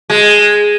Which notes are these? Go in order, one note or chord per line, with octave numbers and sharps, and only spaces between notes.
G#3